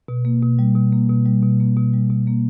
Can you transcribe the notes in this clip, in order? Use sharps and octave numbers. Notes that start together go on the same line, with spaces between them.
B2
A#3
B2
G3
B2
A#3
B2
G3
B2
A#3
B2
G3
B2
A#3